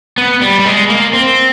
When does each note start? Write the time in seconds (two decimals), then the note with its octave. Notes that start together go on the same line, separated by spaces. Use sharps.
0.18 B3
0.42 G3
0.60 G3
0.66 G#3
0.90 A#3
1.13 C4